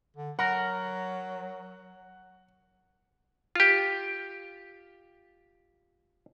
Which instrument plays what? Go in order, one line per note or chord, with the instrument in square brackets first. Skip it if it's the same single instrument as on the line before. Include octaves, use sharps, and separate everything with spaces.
[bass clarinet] D3
[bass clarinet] F#3 [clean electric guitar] A#4 [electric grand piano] F#5
[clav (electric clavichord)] F4 G4